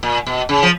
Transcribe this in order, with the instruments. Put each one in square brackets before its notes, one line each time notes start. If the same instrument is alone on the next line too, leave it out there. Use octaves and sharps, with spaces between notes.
[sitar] A#2
B2
C#3
F3